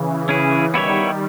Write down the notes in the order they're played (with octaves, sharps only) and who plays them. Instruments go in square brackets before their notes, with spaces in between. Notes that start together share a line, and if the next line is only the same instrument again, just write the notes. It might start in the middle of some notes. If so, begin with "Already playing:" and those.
Already playing: [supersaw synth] C#3 E3
[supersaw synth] C#3 E3 [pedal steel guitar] C#4 E4 G#4
[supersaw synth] D#3 G3 [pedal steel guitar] B3 E4 G4 C#5 E5